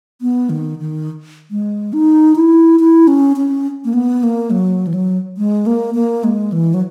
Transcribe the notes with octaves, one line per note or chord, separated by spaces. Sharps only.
B3
D#3
D#3
G#3
D#4
E4
E4
C#4
C#4
A#3
B3
A#3
F#3
E3
F#3
G#3
A#3
A#3
G#3
E3
F#3